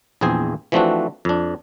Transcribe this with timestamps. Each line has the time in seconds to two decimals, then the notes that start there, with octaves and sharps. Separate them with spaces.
0.21 A#1 E2 C4 G#4 C5 G#5
0.72 E3 F3 A3 C4 D4 F#4
1.25 F2 D4